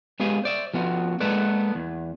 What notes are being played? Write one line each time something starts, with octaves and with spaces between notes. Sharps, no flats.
G#3 B3 G4 F5 G#5
C5 D5 E5
F3 B3 F4 F#4
G#3 A#3 B3 A4 B4 D5
E2